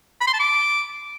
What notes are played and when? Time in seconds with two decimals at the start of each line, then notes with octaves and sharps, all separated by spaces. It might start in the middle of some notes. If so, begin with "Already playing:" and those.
0.21 B5
0.27 C6
0.33 A5
0.40 D6